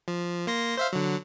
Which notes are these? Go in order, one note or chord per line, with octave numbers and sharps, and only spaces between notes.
F3
A#3 C6 A#6
C5 E5 F5
D3 F#3